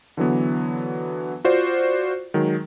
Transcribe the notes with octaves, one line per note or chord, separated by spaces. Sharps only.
D3 E3 F#3 B3
F4 F#4 C5 D5
D#3 F#3 G#3